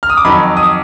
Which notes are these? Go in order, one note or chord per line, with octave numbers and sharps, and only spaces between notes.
F6
D#6
D6
F2 D#3 F#3 B5
D#6